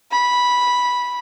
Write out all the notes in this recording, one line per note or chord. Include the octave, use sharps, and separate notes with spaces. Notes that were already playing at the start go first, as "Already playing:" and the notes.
B5